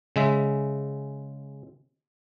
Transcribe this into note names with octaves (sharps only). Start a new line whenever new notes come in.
C#3 G#3 E5